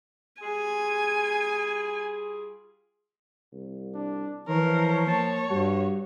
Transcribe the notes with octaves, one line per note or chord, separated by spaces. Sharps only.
G3 F4 G#4 G#5
C2
D4
E3 F3 A#4 C#5
A#3 C#5 A5
G2 G3 F#4